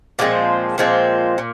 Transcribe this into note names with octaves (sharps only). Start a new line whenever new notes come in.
A#2 F3 G#3 C4
A#2 F3 G#3 C4
A#2